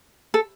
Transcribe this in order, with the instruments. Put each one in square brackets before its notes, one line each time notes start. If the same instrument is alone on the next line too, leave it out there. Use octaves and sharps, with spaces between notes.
[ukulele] A4